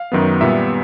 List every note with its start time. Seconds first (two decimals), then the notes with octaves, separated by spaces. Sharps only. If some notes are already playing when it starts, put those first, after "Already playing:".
Already playing: F5
0.12 F#2 D#3 F#3 B3
0.41 A#2 G3 B3 E5